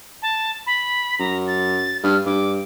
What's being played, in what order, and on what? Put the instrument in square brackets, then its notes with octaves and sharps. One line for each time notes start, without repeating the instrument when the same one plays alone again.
[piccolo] A5
B5
[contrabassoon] F#2 [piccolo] A#5
[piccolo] A6
[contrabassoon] G2 [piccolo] F6
[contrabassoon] G2 [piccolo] D6